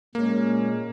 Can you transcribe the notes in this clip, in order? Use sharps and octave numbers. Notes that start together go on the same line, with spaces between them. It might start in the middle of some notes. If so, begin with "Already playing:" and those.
A#2 G#3 A#3 C#4